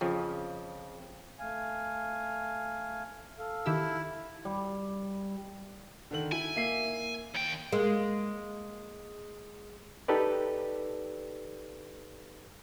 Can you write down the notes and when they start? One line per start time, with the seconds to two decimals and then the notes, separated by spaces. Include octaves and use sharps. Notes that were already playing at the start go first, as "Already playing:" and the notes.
0.01 F2 C#3 F3
1.39 A3 F5 G#5
3.39 A4 F5
3.66 D#3 E4 G4 E6
4.45 G3
6.11 D3 D#3 F#7
6.32 E4 G#5
6.56 A#3 E5 C7
7.35 D#2 G5
7.72 G#3 A#3
10.08 D#4 G4 A4 B4 D5